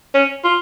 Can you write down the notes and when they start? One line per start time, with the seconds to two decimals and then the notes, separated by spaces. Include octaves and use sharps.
0.14 C#4
0.44 F4